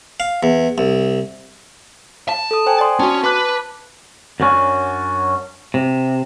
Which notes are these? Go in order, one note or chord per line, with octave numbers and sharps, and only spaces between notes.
F5
E2
C2
A5
A4 D#6
C5 G5 G#5
D5 C6 D#6
C#4 F#4 A5
B4 A5 D6 F#6
F#2 F#3 C#4 D4
C3